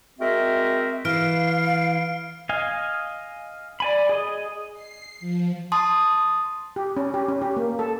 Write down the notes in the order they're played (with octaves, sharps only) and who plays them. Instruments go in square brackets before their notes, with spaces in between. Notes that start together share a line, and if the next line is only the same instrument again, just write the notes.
[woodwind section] G#3 C4 F#4 A#4 E5
[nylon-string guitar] E3 [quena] F5 [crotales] F6 D7
[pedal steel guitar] D#5 F5 G#5
D5 G#5 B5
G#4 D#5
[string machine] C7
F3
[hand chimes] A5 C6 D#6
[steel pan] G4
C#4
G4
C#4
G4
A#3
A4